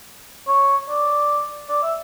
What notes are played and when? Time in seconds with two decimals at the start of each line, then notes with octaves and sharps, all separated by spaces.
0.48 C#5
0.89 D5
1.69 D5
1.83 E5